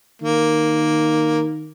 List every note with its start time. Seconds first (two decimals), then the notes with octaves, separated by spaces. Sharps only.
0.22 D#3 A#3